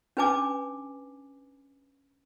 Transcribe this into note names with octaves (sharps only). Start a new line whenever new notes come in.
C#4 D4 B4 G#5 A5 D6